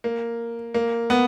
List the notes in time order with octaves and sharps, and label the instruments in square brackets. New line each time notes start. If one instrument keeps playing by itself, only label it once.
[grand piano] A#3
A#3
B3